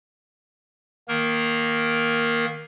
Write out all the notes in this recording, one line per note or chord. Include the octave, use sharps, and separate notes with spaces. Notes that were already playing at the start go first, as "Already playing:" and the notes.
D#3 A#3 A#4